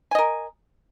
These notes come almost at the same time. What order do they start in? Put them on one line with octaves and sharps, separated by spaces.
G#5 D#5 A#4